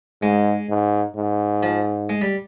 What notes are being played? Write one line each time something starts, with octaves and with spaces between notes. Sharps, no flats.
G#2 G#3
G#2
G#2
F3
G#3
G3